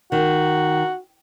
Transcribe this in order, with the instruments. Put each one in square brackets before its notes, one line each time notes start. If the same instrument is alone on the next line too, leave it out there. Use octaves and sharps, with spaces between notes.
[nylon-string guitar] D#3 [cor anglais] F#4